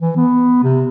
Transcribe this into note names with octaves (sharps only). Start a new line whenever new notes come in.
E3
B3
C3